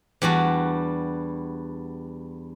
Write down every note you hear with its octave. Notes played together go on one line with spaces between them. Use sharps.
E2 G3 D4 F#4